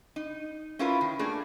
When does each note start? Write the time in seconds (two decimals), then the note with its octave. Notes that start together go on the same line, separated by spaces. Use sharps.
0.16 D#4
0.79 C#4 E4 F4 A#4 B4
1.01 D#3
1.19 A3 A#3 D4 G#4